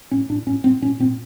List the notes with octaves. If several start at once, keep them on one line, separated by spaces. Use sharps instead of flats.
A2 C#4
A2 D4
A2 C#4
A2 C4
A#2 C#4
A#2 C4